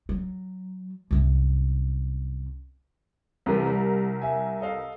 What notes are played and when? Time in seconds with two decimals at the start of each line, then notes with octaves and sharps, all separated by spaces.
0.09 F#3
1.11 C2 F#2
3.46 C2 C3 E3 A#4
3.67 G3
4.22 E5 G#5
4.61 A4 D#5 F5